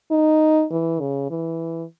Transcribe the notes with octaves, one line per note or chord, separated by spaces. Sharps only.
D#4
E3
C#3
E3